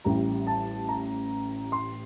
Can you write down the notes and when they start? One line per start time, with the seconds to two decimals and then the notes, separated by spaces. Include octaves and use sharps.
0.05 A1 A2 G3 A#5
0.47 A5
0.89 A#5
1.72 C6